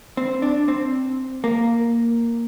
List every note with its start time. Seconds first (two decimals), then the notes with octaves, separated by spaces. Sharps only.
0.17 C4
0.42 D4
0.68 C4
1.44 A#3